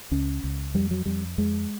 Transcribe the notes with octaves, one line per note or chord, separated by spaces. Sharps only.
C#2 C#4
C#2
F2 G3
F#3
F2 G3
F2 G#3